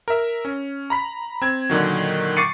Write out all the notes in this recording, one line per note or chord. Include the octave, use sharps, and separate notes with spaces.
A#4 E5
C#4
A#5 B5 B6
C4 G#6
A#2 D3 D#3 F#3
C#6 D6 A6 C7 C#7 D#7